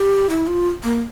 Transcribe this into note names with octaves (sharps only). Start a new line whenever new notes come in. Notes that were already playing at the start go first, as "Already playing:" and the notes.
Already playing: G4
E4
F4
A#3